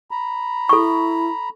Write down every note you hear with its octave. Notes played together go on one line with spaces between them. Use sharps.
A#5 B5
E4 A4 C#6